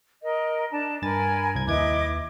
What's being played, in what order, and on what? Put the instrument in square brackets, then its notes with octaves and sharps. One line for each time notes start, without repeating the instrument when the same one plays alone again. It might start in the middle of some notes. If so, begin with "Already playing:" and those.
[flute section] A#4 D#5
D4 A5
[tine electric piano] G2 A6 [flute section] A#4 G#5 B5
[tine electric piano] C2 G#6
[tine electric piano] D#2 B4 G#6 [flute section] E4 D#5 D6